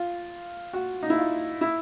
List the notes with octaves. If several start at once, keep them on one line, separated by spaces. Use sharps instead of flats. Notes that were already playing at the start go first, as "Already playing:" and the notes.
Already playing: F4
F#4
D#4
E4
F4
E4